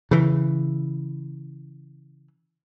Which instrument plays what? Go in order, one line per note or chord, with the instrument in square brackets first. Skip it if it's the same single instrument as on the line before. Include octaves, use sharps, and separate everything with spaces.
[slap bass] C#3 E3